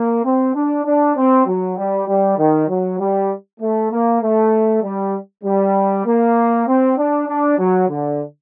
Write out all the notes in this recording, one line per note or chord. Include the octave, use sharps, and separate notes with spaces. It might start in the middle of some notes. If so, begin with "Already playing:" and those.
Already playing: A#3
C4
D4
D4
C4
F#3
G3
G3
D#3
F#3
G3
A3
A#3
A3
G3
G3
A#3
C4
D4
D4
F#3
D3